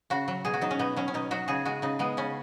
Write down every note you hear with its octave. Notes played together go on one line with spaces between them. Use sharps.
C#3 F#4
F#3
B2 G#4
F#4
F#3 D#4
C#4
B2 B3
F#3 C#4
C#4
B2 D#4
F#3 F#4
C#3 G#4
G#3 F#4
C#3 D#4
G#3 B3
C#3 C#4